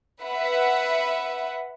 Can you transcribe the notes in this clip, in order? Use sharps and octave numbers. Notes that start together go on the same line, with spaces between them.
B4 E5 F#5